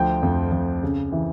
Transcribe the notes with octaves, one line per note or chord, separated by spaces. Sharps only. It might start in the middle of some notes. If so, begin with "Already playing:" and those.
Already playing: D2 F3 G5
F2
F2
C#3
E3